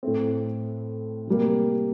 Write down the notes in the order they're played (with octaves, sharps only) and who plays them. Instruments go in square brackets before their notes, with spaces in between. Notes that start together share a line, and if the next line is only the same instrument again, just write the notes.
[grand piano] A2 A3 C4
C3 G3 A#3